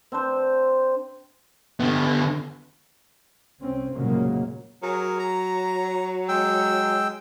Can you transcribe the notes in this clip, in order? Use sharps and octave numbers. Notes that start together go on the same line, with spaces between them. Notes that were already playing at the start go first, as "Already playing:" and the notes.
C4 D4 C5
D3 B3
C2 C4 C#4
F1 A#2 C#3 F#3 G#3 A#3
F#3 G#4 A#4
A#5
G#3 G5 E6